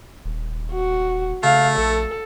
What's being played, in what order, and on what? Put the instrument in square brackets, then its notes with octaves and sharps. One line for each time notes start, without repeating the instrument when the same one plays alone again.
[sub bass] D#1
[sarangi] F#4
[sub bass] C#3 [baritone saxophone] A3 [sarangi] F5
[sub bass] A#1 [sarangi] A4